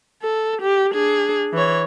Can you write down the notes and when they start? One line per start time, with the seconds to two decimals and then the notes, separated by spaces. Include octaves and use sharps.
0.22 A4
0.62 G4
0.93 D4 G#4
1.53 E3 C#5